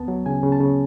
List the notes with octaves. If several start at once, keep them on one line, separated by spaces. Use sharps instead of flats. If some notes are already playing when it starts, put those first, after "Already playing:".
Already playing: D2 B3 A5
F#3
C#3 G#5
C#3
A5
C#3